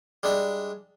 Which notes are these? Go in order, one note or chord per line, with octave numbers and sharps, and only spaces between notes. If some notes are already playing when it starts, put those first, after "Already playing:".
G3 G#3 D4 E5